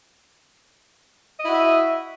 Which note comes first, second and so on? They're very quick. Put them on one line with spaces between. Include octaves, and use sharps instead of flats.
D#5 E4 F#4 E5